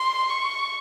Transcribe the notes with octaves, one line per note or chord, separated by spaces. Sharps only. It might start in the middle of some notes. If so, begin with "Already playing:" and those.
Already playing: C6
C#6